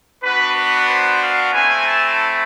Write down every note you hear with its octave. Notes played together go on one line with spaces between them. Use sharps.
B3 D4 F#4 B4
B4
C5
F5
A3 C4 E4 G#5
A5